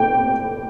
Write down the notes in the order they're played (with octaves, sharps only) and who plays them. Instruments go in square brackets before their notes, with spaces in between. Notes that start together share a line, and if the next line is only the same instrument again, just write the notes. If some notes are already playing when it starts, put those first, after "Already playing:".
Already playing: [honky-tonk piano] G5